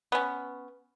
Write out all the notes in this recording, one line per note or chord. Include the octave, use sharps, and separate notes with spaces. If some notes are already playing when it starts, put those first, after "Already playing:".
B3 C#4